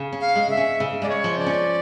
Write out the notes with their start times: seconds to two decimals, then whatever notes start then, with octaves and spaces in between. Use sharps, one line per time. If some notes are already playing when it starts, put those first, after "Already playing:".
Already playing: C#3
0.12 C#4
0.21 F5
0.35 G#3
0.50 E5
0.57 C#4
0.80 C#3
1.02 G#3 D5
1.09 C#5
1.24 F3
1.38 D5
1.46 C#4